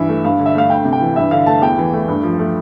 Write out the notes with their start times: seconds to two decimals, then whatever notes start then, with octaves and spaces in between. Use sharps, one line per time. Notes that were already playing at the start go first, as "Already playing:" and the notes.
Already playing: G2 E3 E5
0.09 A3
0.24 G2 F5
0.39 D3
0.46 E5
0.55 A3 F5
0.70 D2 G5
0.85 C3
0.93 G5
1.01 E3
1.16 G2 E5
1.31 D3 F5
1.46 A3 A5
1.62 E2 G5
1.78 E3
1.93 A3
2.08 G2
2.23 F3
2.39 A3